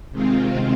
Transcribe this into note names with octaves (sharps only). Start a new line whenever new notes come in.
C3 D#3 G#3 C4 F4